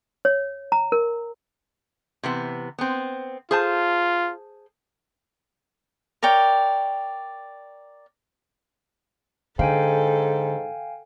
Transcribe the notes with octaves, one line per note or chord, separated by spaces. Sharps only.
C#5
A#5
A#4
C3 E3 B3
B3 C4
F4 G#4 C5 A5
A#4 C#5 D5 G5
G#2 D3 A4 F5 G5 G#5